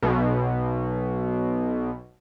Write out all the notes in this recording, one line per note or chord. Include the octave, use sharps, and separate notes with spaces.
B1 B2